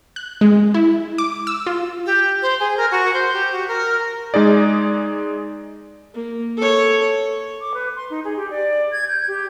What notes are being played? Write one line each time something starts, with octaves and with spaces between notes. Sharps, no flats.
F#6
G#3
E4
D6
E6
F4
G4
C5
G#4
A#4
F#4
C5
G4
F#4
A#4
G#3 D#4 G#4 D5
A#3
A4 C#5
D6
B4
C6
D#4
G#4
G4
D5
G#6
G6
G4